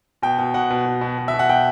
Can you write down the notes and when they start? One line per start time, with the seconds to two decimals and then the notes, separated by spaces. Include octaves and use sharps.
0.22 B2 G5
0.39 B2
0.54 B2 F#5
0.70 B2
0.86 B2
1.01 B2
1.18 B2
1.28 E5
1.34 B2
1.39 F#5
1.49 B2 G5